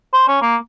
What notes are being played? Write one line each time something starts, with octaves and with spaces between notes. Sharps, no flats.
C5
C#4
A#3